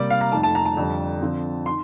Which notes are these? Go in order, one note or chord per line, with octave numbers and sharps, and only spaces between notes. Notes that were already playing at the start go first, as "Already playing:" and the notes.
Already playing: C3 G3 A#3 D5
F5
A#5
F2 D#3 A3 A5
A5
A#5
A5
F2 D3 G3
D3 F3 C4
D#3 C6